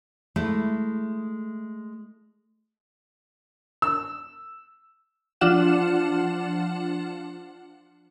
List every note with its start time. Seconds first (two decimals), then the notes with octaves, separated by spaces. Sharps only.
0.36 G#3 A3 E4
3.82 E6
5.41 F3 D4 F4 F#5 E7